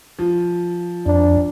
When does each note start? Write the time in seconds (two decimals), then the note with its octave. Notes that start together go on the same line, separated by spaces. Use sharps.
0.19 F3
1.06 F2 D4